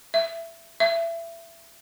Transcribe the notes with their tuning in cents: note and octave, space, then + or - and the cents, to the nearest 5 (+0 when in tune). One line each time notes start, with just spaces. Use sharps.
E5 +15
E5 +25